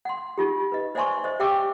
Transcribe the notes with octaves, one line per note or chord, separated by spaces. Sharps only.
F#5 C6
D#4 F4 G4
B4 D#5
C5 D5 E5 G#5 C6 C#6
C5 D#5
G4 E5 G5 C#6 D6 E6